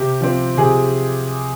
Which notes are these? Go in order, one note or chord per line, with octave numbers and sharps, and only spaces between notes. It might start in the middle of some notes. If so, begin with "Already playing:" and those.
Already playing: C3 G4
F3 C4
C3 G#4